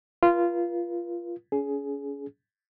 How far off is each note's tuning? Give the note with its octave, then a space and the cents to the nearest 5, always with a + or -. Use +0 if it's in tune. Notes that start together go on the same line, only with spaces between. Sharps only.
F4 -15 B4 -45
C#4 +30 G#4 +15